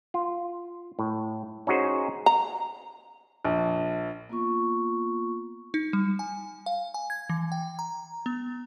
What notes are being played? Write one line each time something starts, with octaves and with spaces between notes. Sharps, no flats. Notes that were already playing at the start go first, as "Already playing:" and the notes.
F4
A2
C#4 D#4 F#4 G#4 C5
A#5
A#1
A#3 B3 F4 C#6
D#4
G3
G#5
F5
G#5
G#6
E3
G5
A#5
B3